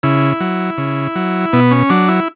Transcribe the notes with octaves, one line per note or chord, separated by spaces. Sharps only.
C#3 E4
F#3
C#3
F#3
B2 B3
C#4
F#3 D4
E4